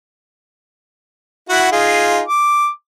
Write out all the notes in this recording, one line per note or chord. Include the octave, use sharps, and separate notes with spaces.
E4 F#4 F#5
D#4 F4 G#4
D6